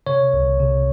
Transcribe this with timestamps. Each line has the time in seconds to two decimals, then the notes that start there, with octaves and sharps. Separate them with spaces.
0.07 C3 C#5
0.33 C2
0.60 C3